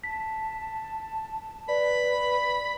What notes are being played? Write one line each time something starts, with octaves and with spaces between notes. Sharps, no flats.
A5 B6
B4 D5 B5